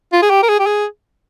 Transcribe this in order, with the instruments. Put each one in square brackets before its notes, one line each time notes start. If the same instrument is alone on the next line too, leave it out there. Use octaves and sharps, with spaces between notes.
[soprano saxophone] F4
G#4
G4
A#4
G#4
G4
G#4